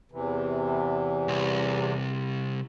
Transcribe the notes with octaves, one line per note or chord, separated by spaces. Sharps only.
E2 C3 E3
C2